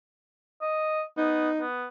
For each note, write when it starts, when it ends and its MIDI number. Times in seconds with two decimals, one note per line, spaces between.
0.62 1.03 75
1.17 1.50 59
1.17 1.62 63
1.60 1.87 59